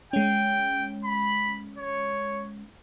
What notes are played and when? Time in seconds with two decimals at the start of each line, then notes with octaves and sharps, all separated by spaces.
0.13 G#3 C#4 G5
1.04 B5
1.78 C#5